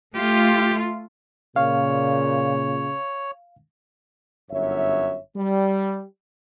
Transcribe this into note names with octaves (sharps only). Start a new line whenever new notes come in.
A3 F4 G4
A#2 C#3 C#5 F5
G1 F#2 C#5 E5
G3